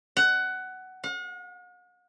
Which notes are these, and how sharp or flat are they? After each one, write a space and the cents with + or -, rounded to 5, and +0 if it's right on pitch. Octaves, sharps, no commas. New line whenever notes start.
F#5 +15
F#5 -45